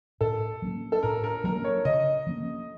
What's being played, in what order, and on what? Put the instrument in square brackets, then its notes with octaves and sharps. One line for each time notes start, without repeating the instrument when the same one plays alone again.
[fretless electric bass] A2 [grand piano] A4
[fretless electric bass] F#3 A#3 C#4
[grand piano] A4
[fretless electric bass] A2 [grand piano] A#4
[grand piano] A#4
[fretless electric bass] F#3 A#3 C#4 [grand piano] A#4
[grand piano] C#5
[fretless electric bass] C#3 [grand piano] D#5
[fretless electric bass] F3 A#3 C#4